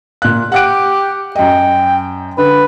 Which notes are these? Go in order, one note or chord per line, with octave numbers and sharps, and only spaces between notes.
A#2 F#6
G4 F#5 F#6 D7
F#2 D#5 G5
D3 B4